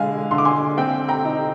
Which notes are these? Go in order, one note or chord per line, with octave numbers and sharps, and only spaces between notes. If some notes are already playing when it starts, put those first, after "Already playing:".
Already playing: D3 G#3 F5 G#5
D3 C6
D6
G#5 C6
C4 G5
G5 A#5
D#4